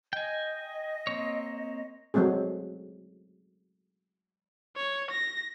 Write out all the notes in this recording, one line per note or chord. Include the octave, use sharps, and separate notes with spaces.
D#5 G5 G#5
A#3 C4 C#5
F#3 G#3 A3 C4 G#4
C#5
A#6